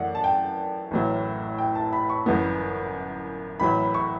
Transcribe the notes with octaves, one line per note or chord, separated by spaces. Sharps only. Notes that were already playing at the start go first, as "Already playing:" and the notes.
Already playing: F#2 E3 A3 D5 F#5
A5
G5
A1 A2 F#3
G5
A5
B5
C#6
G1 F#2 E3 B3
A1 A2 F#3 B5
C#6